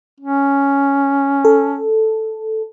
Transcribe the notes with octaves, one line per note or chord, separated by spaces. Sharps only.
C#4
A4